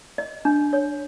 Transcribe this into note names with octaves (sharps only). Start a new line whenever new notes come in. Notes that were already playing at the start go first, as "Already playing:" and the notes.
D#5
D4
C#5